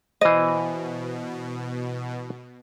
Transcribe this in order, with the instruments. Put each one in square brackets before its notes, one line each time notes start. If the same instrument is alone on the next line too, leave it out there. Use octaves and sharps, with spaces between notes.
[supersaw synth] B2 [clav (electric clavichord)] E3 C5 [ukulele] D#5